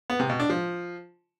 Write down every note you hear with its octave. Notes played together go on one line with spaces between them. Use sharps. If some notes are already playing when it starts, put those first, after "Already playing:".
B3
C3
B2
D4
F3